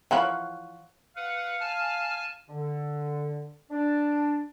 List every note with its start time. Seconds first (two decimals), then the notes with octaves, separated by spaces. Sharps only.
0.11 E3 F3 C#5 F5 F#5 B5
1.16 B4 F5 F#5
1.60 G#5 A5 F6
2.49 D3
3.70 D4